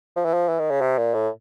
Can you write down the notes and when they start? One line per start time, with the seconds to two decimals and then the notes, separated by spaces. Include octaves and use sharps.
0.16 F3
0.25 E3
0.33 F3
0.49 E3
0.59 D#3
0.71 C#3
0.81 C3
0.98 A#2
1.14 A2